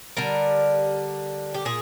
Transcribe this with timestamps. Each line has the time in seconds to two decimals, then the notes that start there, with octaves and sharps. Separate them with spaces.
0.17 D3 G3 A#4
1.54 G4
1.65 A#2 G#4